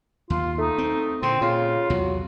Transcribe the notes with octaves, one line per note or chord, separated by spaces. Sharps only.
D#2 F4
A3 D#4
C4
A#2 D3 C4
A#2 C#3 F4
B1 E2 C3 F#3